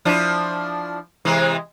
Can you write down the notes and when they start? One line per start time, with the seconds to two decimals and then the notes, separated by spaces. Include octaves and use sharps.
0.05 F3 D4 E4
1.25 C3 E3 G#3